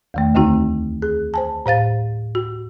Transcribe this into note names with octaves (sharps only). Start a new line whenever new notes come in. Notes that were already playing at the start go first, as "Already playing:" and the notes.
E2 D#3 A3
D2 D3 A3 C4 D#4 F#4
G#4
C5 G#5 A5
A2 C5 F5 A6
F#4